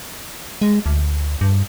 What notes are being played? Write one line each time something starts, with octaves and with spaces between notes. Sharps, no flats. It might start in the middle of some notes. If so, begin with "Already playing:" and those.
G#3
D2
G2